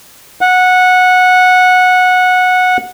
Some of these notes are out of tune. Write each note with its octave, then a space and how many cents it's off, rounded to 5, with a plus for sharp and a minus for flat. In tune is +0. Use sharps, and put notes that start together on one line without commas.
F#5 -15